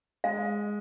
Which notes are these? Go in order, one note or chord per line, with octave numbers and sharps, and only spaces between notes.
G#3 F5